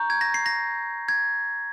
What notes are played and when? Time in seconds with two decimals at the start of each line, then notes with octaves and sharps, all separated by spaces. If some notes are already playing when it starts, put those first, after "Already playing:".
Already playing: A#5 C#6 G6
0.10 G#6
0.21 A#6
0.34 C7
0.46 A#6
1.08 G#6